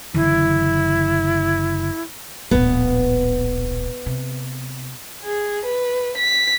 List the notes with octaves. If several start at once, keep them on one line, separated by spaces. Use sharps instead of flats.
F#1 D3 E3 E4
D1 A#1 B3
C3
G#4
B4
B6